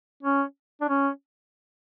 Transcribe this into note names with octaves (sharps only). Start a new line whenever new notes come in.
C#4
D4
C#4